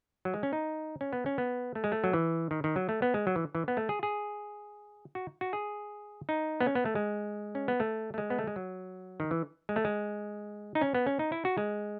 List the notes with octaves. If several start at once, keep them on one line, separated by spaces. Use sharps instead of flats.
F#3
G#3
C#4
D#4
C#4
B3
C#4
B3
A3
G#3
A3
F#3
E3
D#3
D#3
F#3
A3
B3
G#3
F#3
E3
E3
B3
A3
G#4
G#4
F#4
F#4
G#4
D#4
B3
C#4
B3
A3
G#3
C#4
B3
A3
A3
G#3
B3
A3
G#3
F#3
D#3
E3
G#3
A3
G#3
D#4
C#4
B3
C#4
D#4
E4
F#4
G#3